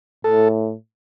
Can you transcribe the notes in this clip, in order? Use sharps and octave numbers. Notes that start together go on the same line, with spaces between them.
A2 A4